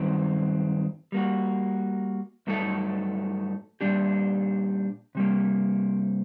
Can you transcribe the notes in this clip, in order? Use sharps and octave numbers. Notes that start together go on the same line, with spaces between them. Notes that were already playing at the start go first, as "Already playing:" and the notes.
Already playing: G2 D#3 F#3 C4
G3 A#3 F#4
G2 F#3 A3 D#4 A4
A#2 G3 D4 G4
C3 G3 A#3